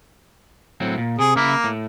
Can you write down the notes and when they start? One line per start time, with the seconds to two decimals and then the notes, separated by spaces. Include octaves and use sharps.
0.80 A2 F#3 C4
0.98 A#2
1.19 C3 G#4
1.36 C#3 A#3 E5 B5
1.64 A2